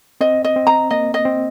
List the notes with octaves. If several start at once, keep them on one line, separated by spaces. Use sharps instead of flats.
C4 D#5
D#5
C4
A#5
A#3 D#5
D#5
C4